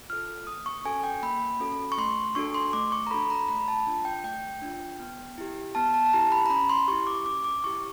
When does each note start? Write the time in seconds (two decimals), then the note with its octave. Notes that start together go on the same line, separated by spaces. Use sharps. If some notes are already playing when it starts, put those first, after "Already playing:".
0.09 F4 A4 F6
0.47 A#3 D#6
0.66 C#6
0.84 C#4 F#4 A4 G#5
1.04 G5
1.23 A#3 B5
1.60 C#4 F#4 A4
1.92 C#6
1.97 A3 C6
2.35 D4 F#4 A4 C#6
2.54 C6
2.73 A3 D6
2.92 C#6
3.07 A#5
3.11 D4 F#4 A4 B5
3.30 A#5
3.48 A3 B5
3.68 A5
3.86 D4 F4
4.05 G5
4.24 A3 G5
4.62 D4 F4
5.00 B3
5.38 E4 G4
5.75 B3 A5
5.94 A5
6.06 A5
6.13 E4 G4 A#5
6.32 B5
6.46 A#5
6.50 C#4 B5
6.69 C6
6.88 E4 G4 C#6
7.07 D6
7.26 C#4 D6
7.44 D6
7.64 E4 G4 C#6